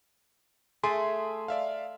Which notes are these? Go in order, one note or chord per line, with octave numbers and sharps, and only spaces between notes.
A3 G#4 E5 G#5 C6
D5 E5 F5